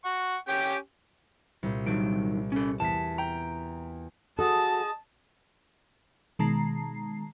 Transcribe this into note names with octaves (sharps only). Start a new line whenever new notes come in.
F#5 C#6
C#4 G4 G5
C2 A#2
G2 D#3 F#3 D7
C#4 A4
E2 A5 B6
G5 A#5
F#4 G#4 A4 D#5 A5
B2 D#3 G#3 A5 A#5 C7